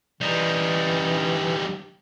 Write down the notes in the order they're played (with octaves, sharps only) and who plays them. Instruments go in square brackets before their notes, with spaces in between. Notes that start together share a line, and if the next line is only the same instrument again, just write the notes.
[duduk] E3 [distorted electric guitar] G3 D#4